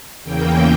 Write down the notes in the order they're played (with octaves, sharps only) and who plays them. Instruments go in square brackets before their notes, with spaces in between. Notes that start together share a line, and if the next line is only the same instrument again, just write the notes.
[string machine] E2 C#3 E3 A#3 G5